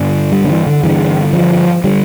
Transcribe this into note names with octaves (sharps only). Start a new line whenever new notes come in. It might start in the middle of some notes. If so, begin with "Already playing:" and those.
Already playing: G2 D3
G3
D3
E3
D3
G2 D3 E3
F3
D3 G3